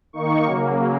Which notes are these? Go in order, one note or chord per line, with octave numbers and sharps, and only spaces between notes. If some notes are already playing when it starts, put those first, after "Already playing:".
D#3 A#3 D#4 C#6
C#3 F#3 A#3